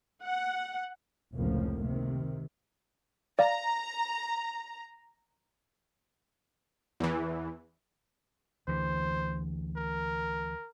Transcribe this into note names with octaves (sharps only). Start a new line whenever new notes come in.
F#5
F1 C#2 A2 C#3 F3 A#3
C3 D#3
D5 F5 A#5
E2 E3
D2 E3 C5
A#4